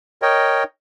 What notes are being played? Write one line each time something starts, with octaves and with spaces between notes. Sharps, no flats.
A#4 C#5 D#5 G5